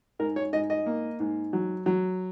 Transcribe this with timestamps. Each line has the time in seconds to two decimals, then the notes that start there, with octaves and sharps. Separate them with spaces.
0.19 G#2 A#4
0.36 C#5
0.53 G#2 D#5
0.70 D#5
0.86 A#3
1.20 G#2
1.53 F#3
1.86 F#3